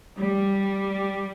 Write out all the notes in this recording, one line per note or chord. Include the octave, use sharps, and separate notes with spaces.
G3